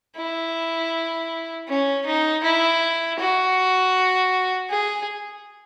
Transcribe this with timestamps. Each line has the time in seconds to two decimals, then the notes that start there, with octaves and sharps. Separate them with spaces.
0.17 E4
1.68 C#4
2.06 D#4
2.44 E4
3.19 F#4
4.70 G#4